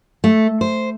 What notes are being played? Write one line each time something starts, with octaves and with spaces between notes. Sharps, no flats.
A3
C5